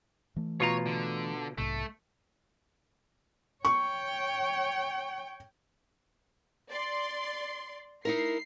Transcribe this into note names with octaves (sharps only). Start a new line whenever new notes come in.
E3 A3
B2 F4 C#5 A#5
D3
B1 G#2 C3 A3
C#5 G5 C#6
D5 C6
D#4 E4 A#4 C7